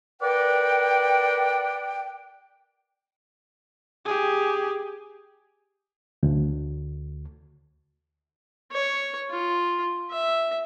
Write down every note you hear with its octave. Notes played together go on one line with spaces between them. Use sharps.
A#4 B4 D5 F#5 G5
G4 G#4
D2
C#5
F4
E5